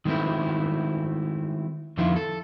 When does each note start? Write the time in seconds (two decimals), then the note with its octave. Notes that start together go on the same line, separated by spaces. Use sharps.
0.05 D#3 G#3 A3 C4 E4
1.97 F2 D3 D#3 F3 E4 F4
2.16 A4